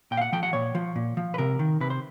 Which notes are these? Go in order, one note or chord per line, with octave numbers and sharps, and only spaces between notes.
A#2 G5
F5
F#5
F3 G5
F#5
A#2 C#5
F3
A#2
F3
B4
C3 A#4
D#3
C3 B4
C5